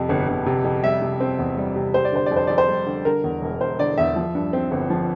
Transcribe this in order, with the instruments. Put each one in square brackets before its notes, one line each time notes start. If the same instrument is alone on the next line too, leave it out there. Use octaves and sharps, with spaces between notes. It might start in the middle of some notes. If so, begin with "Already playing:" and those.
Already playing: [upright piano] F2 C3
G1
G1
C3
F2
G3 E5
C3
C4
E2
G3
C3
G3 C5
D5
D3 C5
F2 D5
C5
F2 D5
C5
G3
D3
D3 A#4
E2
E1
E1 C5
D3 D5
E2 E5
F3
G2
C4
G1
F3